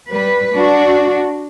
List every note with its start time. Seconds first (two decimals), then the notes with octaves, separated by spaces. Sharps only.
0.12 G3 B4
0.56 D4 F#4